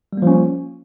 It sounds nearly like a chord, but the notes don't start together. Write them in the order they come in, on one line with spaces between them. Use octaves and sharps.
G3 A#3 F3 C#4